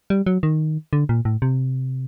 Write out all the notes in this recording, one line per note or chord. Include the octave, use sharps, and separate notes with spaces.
G3
F#3
D#3
D3
A#2
A2
C3